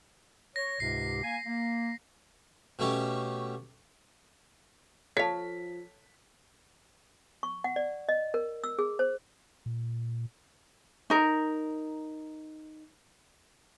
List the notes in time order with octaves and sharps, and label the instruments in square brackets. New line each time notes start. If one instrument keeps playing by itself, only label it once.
[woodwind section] C#5 [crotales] A#6
[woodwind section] C#2 G#2 C3 [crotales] C7
[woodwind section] A#3 G#5
A#3
[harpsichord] B2 A3 C#4 G4
[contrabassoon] F3 [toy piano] A4 A5 [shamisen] C#5 F5 [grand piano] B6
[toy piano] C#6
F#5
D5
D#5
A#4
E6
G#4
C5
[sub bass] A#2
[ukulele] D#4 A#4